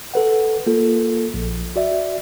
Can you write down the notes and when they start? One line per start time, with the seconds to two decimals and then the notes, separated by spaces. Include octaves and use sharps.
0.14 A4 B4 F#5
0.67 A#3 F4 A4
1.34 A#1
1.76 F#4 D5 E5